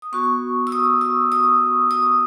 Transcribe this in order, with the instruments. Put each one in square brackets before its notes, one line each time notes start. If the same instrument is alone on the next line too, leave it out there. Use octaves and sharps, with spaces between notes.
[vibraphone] D#6
B3 F#4 C#6
E6
D#6
E6
D#6
D#6